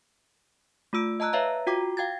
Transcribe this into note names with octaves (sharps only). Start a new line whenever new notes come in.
A3 F4 E6 D7
D#5 A5 A#5 E6 F#6
B4 C#5 E5 F5 A#5
F4 F#4 G5 A#5 D6
F5 G5 G#6 A6